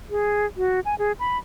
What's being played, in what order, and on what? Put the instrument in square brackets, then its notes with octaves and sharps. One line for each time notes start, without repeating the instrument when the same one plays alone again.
[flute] G#4
F#4
G#5
G#4
B5